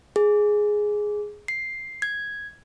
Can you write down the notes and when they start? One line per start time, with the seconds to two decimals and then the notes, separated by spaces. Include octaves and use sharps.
0.16 G#4
1.48 C7
2.02 G#6